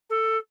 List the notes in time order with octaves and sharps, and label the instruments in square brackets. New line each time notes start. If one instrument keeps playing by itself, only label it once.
[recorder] A4